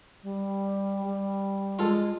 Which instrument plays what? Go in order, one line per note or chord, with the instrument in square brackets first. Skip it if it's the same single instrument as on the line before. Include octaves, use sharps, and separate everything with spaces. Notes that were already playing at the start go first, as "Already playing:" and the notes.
[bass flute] G3
G3
[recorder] G#3 [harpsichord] F4 A4